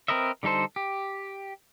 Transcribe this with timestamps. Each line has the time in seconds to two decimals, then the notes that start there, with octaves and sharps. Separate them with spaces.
0.08 C4 A#4 B4 D#5 E5
0.43 D3 G3 D#4 A4 C5
0.76 G4